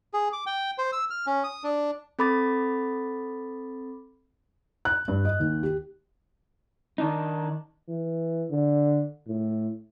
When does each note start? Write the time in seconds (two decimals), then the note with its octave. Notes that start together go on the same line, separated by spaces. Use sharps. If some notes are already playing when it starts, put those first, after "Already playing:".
0.13 G#4
0.33 D6
0.46 G5
0.78 C5
0.92 E6
1.10 F6
1.27 C#4
1.44 D#6
1.64 D4
2.19 C4 A4 B5 D6 A6
4.85 F#6
5.08 G2
5.25 D#5
5.40 D#2
5.63 G4
6.98 D#3 D4 D#4
7.89 E3
8.51 D3
9.27 A2